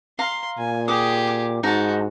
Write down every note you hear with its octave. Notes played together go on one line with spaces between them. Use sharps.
F5 A#5 C6
A#2 G#5
G4 G#4 D6 D#6
D6
G#2 D#4 F#4 A5